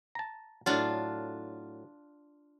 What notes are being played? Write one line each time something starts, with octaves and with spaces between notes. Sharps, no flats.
A5 A#5
A2 F#3 D4 F4